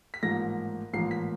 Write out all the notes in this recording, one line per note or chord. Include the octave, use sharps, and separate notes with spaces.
B6
A1 G#2 F3 A#3 A#6
A1 G#2 F3 A#3 C7
B6